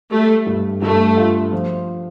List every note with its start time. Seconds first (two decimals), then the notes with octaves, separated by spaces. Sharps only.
0.11 G3 A3
0.46 G2
0.82 G2 A3
1.17 F4
1.52 F3